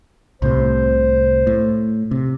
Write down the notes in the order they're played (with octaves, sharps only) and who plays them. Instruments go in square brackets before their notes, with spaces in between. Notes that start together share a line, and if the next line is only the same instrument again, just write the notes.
[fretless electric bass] C2 A2 C3 [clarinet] C5
[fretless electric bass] A2
C3